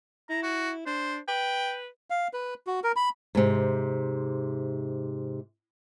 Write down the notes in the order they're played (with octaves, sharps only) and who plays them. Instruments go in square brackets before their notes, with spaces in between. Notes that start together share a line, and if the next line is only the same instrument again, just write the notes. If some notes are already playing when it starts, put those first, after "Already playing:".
[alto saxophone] E4 [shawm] A#5
[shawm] F#4
[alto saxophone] D4 [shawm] C5
[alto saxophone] B4 [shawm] G5
[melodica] F5
B4
F#4
A#4
B5
[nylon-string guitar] G#2 C3